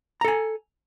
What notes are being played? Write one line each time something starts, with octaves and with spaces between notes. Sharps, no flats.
A4 G#5 A#5